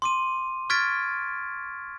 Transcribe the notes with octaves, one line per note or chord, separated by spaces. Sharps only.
C6 D6 D#7
C#6 F6 G#6 A6 B6 D7